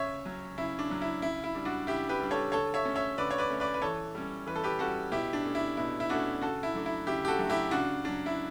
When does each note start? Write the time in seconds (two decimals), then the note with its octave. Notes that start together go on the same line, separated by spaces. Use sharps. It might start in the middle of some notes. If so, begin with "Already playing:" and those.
Already playing: C#3 C#5 E5
0.25 F#3 C#4
0.57 C#3 E4
0.79 D4
0.90 F#3 C#4
1.02 E4
1.22 C#3 E4
1.44 E4
1.54 G3 D4
1.65 D4 F#4
1.87 C#3 E4 G4
2.09 G4 B4
2.20 G3 D4
2.31 A4 C#5
2.52 D3 A4 C#5
2.74 C#5 E5
2.85 A3 C#4
2.96 C#5 E5
3.18 D3 B4 D5
3.31 C#5
3.38 B4 D5
3.50 A3 C#4
3.60 B4 D5
3.74 B4
3.82 E3 A4 C#5
4.14 G3 C#4
4.47 E3 B4
4.56 A4
4.64 G4 B4
4.79 G3 C#4 F#4 A4
5.12 B2 E4 G4
5.33 D4
5.44 A3 C#4
5.55 E4
5.77 B2 E4
6.00 E4
6.09 A3 C#4 D4 F#4
6.41 C#3 F#4 A4
6.63 E4
6.75 F#3 A3 D4
6.86 E4
7.07 C#3 E4 G4
7.25 G4
7.28 F#4 A4
7.39 F#3 A3 D4
7.50 E4 G4
7.71 C#3 D4 F#4
8.05 F#3 C#4 D4
8.26 E4